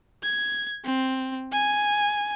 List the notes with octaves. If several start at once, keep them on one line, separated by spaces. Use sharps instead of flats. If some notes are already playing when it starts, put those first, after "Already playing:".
G#6
C4
G#5